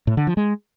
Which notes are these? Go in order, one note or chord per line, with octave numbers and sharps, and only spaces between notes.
A2
D3
F3
G#3